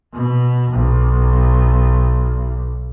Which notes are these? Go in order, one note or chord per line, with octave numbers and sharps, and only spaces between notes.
B2
B1